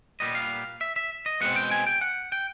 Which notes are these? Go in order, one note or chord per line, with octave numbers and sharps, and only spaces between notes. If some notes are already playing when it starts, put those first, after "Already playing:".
A#2 G3 B3 D#5
F5
E5
E5
D#5
B2 G#3 C4 F#5
G5
G#5
G5
F#5
G5